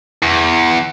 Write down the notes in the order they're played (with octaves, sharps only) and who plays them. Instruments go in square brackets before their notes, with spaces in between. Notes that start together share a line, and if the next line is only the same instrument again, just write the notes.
[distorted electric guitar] E2